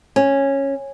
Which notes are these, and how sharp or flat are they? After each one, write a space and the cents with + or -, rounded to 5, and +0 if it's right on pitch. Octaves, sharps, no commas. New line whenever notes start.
C#4 -10